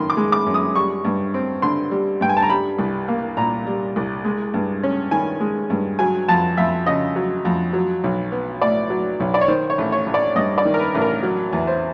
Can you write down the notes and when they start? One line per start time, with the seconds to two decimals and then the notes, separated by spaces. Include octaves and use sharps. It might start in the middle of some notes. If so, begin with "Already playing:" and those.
Already playing: F#2 D#3 C6
0.10 D6
0.17 G#3
0.32 D6
0.46 F#2
0.54 D#6
0.75 G3 C#6
1.05 G2
1.34 C4
1.62 D3 C6
1.91 G3
2.21 G2 G5
2.29 G#5
2.37 A5
2.42 A#5
2.50 G3 B5
2.79 C2
3.08 A#3
3.37 A#2 A#5
3.67 G3
3.96 C2
4.25 G#3
4.54 G2
4.83 C#4
5.11 D#3 G#5
5.40 G#3
5.70 G2
5.99 F#3 G#5
6.28 F2 A5
6.57 F2 E5
6.86 C#3 D#5
7.16 F#3
7.45 F2
7.73 F#3
8.04 B1
8.32 B3
8.61 A2 D5
8.90 F#3
9.20 B1
9.34 D5
9.41 C#5
9.48 D#3 C5
9.70 C#5
9.78 A1
9.92 C#5
10.07 A1
10.14 D5
10.35 G2 D#5
10.58 D5
10.65 D#3
10.74 A#4
10.79 B4
10.95 A1
11.01 A#4
11.23 F#3
11.53 E2
11.67 C5